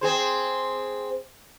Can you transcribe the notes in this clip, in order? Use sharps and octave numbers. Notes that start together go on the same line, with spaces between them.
C4 G#4 C5